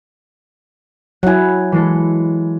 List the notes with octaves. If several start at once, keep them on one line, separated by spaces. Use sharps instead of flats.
F#3 E4 F#5 G#5
E3 G#3 A4